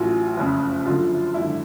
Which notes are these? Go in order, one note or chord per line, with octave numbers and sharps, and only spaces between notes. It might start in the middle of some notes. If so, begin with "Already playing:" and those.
Already playing: A1 A2 F#3 F4
F#1 F2 C#3
F#2 D3 F3 F4
G#1 F#2 D3 E4